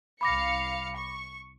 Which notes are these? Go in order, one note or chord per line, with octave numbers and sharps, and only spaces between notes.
C2 F5 B5 D6 A#6 C#7
C#6